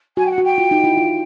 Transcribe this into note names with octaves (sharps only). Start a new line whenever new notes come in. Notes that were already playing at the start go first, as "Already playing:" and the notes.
F#4 G#5
G5
F#5
F#4
G5
F4
D#4
E4
F4